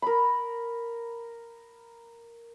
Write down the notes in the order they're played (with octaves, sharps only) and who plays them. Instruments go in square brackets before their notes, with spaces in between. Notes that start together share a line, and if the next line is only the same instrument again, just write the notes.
[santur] A#4 B5